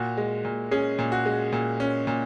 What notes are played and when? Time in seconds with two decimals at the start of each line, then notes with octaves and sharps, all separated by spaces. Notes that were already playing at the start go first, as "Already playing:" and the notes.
Already playing: A#2 F#4
0.17 G#3
0.45 A#2
0.71 C#4 G#4
0.99 A#2
1.12 F#4
1.26 G#3
1.52 A#2
1.80 C#4
2.07 A#2